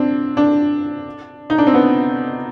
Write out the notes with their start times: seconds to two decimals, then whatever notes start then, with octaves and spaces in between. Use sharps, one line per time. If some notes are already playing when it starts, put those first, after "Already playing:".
Already playing: C4 D4
0.37 D4
1.50 D#4
1.58 D4
1.67 C4
1.74 B3